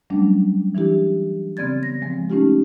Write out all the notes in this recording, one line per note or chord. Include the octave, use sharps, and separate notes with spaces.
F#3 G3 A3 C#4 D4
E3 D4 E4 G4
C#3 B3 C4 D5 G#6 A6
A#6
F3 G#3 C4
A3 C#4 D#4 F4 G4